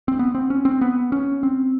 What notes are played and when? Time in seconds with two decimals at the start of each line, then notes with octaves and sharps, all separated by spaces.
0.08 C4
0.19 B3
0.35 C4
0.50 C#4
0.65 C4
0.81 B3
1.12 C#4
1.43 C4